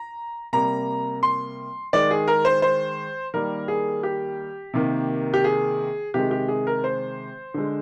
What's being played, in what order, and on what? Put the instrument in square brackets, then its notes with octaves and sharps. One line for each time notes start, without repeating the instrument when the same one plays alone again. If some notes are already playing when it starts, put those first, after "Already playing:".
Already playing: [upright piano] A#5
C3 G3 A#3 A#5
C6
D#3 G#3 D5
G#4
A#4
C5
C5
D#3 G3 A#3 A#4
G#4
G4
C3 D#3 A#3
G4
G#4
C3 D#3 G#3 G4
G4
G#4
A#4
C5
D3 G#3